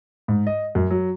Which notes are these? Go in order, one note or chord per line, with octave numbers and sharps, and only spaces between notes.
G#2
D#5
F#2
F#3